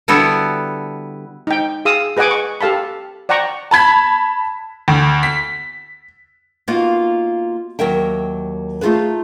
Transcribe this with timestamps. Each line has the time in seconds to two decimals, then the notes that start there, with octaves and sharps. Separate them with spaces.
0.08 D3 G3 B3 E4 F#4 A4
1.47 D#4 G5
1.85 G#4 F5 D#6 E6
2.17 G#4 B4 D#5 F#5 G#5 D6
2.31 C#6
2.61 G4 A4 F5 A5 B5
3.29 D5 F#5 G5 A#5 C#6
3.71 A5 B5 G#6 B6
4.88 D2
5.23 B6
6.68 A#3 B3 D#4 F4 F#4
7.79 D#2 F#3 A#4 E5 G5
8.81 A3 D#4 F4 G#4 B4